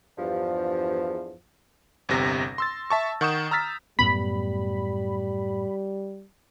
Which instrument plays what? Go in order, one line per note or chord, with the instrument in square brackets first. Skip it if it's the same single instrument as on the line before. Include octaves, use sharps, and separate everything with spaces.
[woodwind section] E2 G2 F3
[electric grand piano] G1 E2 C3 A#6
C6 E6 A6
E5 A5 C#6
D#3 F#5 C#6 D#6 G6 E7
A#5 E6 F6 A6 B6
[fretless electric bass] F#2 A2 B3 [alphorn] G3 [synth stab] B5